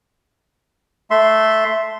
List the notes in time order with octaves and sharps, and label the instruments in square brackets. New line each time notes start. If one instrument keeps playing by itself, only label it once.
[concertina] A3 E5 C6